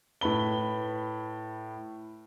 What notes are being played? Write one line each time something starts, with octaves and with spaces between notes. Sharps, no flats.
A2 B4 B5 G7